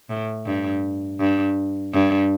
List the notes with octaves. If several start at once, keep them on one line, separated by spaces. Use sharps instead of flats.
A2
G2
G2
G2